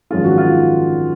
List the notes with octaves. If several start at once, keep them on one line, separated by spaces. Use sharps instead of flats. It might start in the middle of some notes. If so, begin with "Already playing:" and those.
G#1 F#2 F3 G#3 F4
F#4
F4